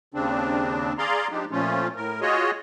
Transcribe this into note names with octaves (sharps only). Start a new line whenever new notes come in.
D#2 C#3 C4 D4
G#4 D5 F5 A#5 C6
F3 G#3 D4 D#4 G4
A#2 F3 A3 C#4 F4
A2 A#4
F4 F#4 G#4 C#5 D#5